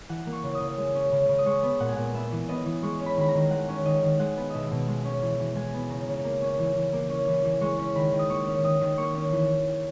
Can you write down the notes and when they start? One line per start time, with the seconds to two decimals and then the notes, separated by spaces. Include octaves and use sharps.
0.09 E3 F#5
0.27 A#3
0.33 C#6
0.43 C#3
0.55 D#6
0.61 C#3
0.78 G#3
0.95 C#4
1.12 C#3
1.29 C#3
1.38 D#6
1.46 G#3 C#6
1.63 B3
1.80 A#2 F#5
1.89 G#5
1.96 A#2 F#5
2.14 B3 E5
2.32 E3
2.49 B3 D#5
2.66 E3
2.83 G#3 C#6
3.00 C#4
3.06 B5
3.17 D#3 B5
3.28 A#5
3.35 D#3
3.51 G#3 F#5
3.68 C#4
3.85 D#3 D#5
4.03 D#3
4.19 G#3 F#5
4.37 B3
4.50 B2 D#5 E5
4.71 B2
4.88 G#3
5.05 C#4
5.22 E3
5.39 E3
5.56 G#3 G#5
5.74 B3
5.90 C#3 A#5
6.08 C#3
6.24 A#3
6.42 C#4
6.59 E3
6.76 E3
6.93 A#3
7.10 C#4
7.27 E3
7.45 E3
7.61 G#3 C#6
7.78 C#4
7.95 D#3 B5
8.12 D#3
8.19 D#6
8.30 A#3 C#6
8.47 C#4
8.64 D#3 D#6
8.81 D#3
8.98 A#3 C#6
9.15 C#4
9.32 E3